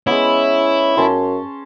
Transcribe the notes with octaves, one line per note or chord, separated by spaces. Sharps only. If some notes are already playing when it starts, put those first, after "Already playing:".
G#3 B3 C#4 E4
F#2 C#4 A5 C6